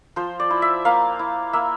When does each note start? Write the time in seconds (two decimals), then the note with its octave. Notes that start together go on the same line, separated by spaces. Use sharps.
0.16 F3 C5
0.40 D5
0.50 E4
0.62 E5
0.85 A#3 F5
1.19 E4
1.53 A#3 E5